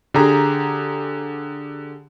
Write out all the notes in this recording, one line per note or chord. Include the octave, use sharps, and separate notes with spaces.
D3 G4 G#4 A#5